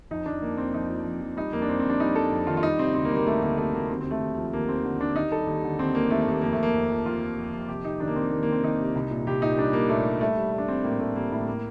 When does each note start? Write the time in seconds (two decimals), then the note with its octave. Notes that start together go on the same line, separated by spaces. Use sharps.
0.11 F2 D#4
0.26 F2 D4
0.42 F2 A#3
0.57 F2 C4
0.74 F2 D#4
0.89 F3
1.06 F2
1.21 F3
1.37 G3 D#4
1.52 F2 A#3
1.62 D4
1.68 F2 C4
1.80 C4
1.84 F2
1.89 D4
2.00 G3 D#4
2.15 G3 A4
2.31 F2
2.47 D#3 F4
2.57 F4
2.63 G3 D#4
2.79 C3 C4
2.94 D2 C4
3.05 A#3
3.10 G3
3.16 A#3
3.26 D2 A3
3.42 D2 A#3
3.57 C3 A3
3.74 D2 A#3
3.89 D#2 C4
4.01 C4
4.05 D#2
4.11 A3
4.21 D#2
4.37 F3
4.52 D#2 A#3
4.69 D#2 C4
4.84 D3
5.00 D3 D4
5.15 D#2 D#4
5.31 G3 A4
5.47 D#2
5.63 D3
5.79 D#2 C4
5.94 G3 A#3
6.10 D#2 A3
6.22 A3
6.27 D#2 A#3
6.42 F2 A#3
6.52 A3
6.58 F2 A#3
6.74 F2
6.90 F3
7.05 F2 F4
7.21 F2
7.38 F2
7.53 F2
7.68 C3 G4
7.84 C3 D#4
8.00 D#3 D4
8.07 A#3
8.16 D#3 C4
8.31 D#3 A#3
8.43 D#3 A#3
8.52 C4
8.63 D#3 D#4
8.79 C3
8.95 C2
9.11 A#2
9.27 C2 G4
9.42 A#2 D#4
9.57 G3 D4
9.73 G3 A#3
9.89 A#2 A3
10.05 G3
10.21 G3 A3
10.36 G3
10.52 G3
10.58 D4
10.68 G3 C4
10.84 A2 A#3
10.99 A2 A3
11.16 G3 A#3
11.32 A2 A3
11.48 A#3